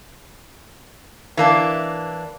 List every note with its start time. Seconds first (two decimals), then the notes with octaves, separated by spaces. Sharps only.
1.37 E3 A#3 D4